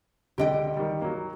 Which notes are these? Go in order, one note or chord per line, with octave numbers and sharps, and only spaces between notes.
C#2 D3 G4 D#5 G5
D#3 G3
F#3 A#3